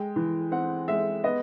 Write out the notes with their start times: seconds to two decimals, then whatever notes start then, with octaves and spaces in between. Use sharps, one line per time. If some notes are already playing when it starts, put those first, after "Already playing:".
Already playing: G#3 G5
0.16 E3
0.51 C4 F#5
0.88 G#3 E5
1.24 B3 D#5